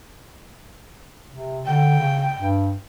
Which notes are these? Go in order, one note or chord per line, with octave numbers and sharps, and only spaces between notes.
C3
D3 G5
C#3
G2